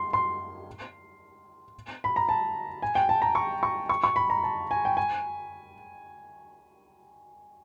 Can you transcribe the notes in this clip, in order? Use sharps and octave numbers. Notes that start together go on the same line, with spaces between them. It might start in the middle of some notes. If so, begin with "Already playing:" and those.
Already playing: C6
C6
B5
A#5
A5
G#5
G5
A5
A#5
C#6
C#6
C#6
C#6
B5
A#5
A5
G#5
G5
G#5